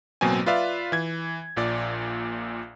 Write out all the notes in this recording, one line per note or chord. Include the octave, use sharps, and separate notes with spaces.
A1 B2 F#3 A#3 C4 G#5
F4 B4 D5 E5 F5
E3 G#6
A#1 A#2 D5